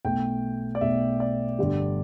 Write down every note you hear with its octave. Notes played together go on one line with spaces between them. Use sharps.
B1 B2 A3 G5
D5
B1 B2 A3 E5
D5
G1 G2 D3 G3